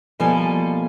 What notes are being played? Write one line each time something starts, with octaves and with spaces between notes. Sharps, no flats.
B2 F3 G3 A#3 A4 G#5